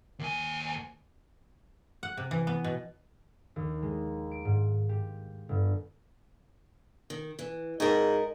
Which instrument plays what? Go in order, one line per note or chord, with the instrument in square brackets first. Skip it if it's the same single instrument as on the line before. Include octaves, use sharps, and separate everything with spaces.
[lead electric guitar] D#2 G#5
[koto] F#5
C3
E3
B3
B2
[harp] D#2
G#3
D7
G#2
G4
G1
[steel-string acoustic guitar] D#3
E3
[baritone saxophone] G#2 [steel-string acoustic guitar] A#4 D#5